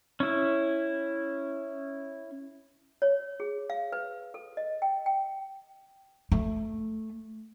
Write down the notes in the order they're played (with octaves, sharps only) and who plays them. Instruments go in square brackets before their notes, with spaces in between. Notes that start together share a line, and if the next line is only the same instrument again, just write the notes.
[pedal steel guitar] C#4 E4
[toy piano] C#5
G#4
F5
B4
A4
D#5
G5
G5
[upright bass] A3